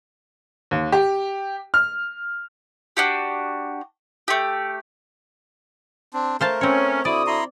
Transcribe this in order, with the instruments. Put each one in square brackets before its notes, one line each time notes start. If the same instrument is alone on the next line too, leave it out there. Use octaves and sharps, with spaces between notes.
[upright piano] D#2
G4
F6
[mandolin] D4 F#4 G4
A3 G4
[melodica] C4 D4
[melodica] A3 A#4 [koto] C5 F5 A5
[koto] C4 C#5 [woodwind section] C#4
[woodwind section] D3 F#4 D#6 [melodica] E4 [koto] D5
[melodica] E4 A#5 C6